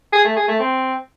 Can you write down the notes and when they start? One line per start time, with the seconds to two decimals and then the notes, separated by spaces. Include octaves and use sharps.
0.13 G#4
0.25 A3
0.36 G#4
0.48 A3
0.60 C4